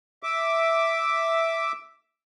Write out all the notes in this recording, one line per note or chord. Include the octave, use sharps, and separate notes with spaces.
E5 D6